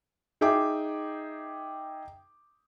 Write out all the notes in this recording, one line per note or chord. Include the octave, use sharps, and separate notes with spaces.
D#4 G#4 E5 G5 D6